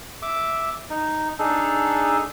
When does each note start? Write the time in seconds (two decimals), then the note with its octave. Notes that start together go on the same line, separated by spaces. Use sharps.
0.22 E5 D6
0.90 D#4
1.39 D4 D#4 G#4 A4